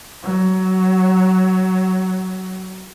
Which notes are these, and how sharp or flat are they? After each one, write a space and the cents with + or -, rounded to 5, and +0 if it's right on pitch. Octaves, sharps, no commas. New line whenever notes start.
F#3 +15